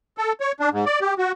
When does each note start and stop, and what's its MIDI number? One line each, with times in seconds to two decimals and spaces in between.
0.18 0.32 69
0.40 0.52 73
0.60 0.69 62
0.72 0.85 44
0.86 0.99 74
1.01 1.14 67
1.18 1.32 66